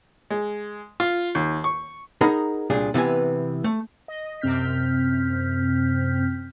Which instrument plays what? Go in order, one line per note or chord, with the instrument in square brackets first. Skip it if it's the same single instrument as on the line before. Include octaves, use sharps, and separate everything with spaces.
[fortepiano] G#3
F4
D#2
C#6
[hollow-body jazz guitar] D#4 G#4 A#4 F#5 A#5 B5
C2 A#2 D4 G#4
C3 E3 B3 B4 G#5
A3
[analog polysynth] D#5
F#2 C3 C4 F6 G6 B6